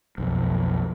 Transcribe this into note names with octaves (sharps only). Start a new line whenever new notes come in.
B1 F2